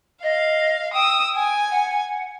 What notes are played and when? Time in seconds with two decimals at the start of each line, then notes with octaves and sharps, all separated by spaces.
0.23 D#5 F5
0.94 G5 D#6 E6
1.36 G#5
1.71 F#5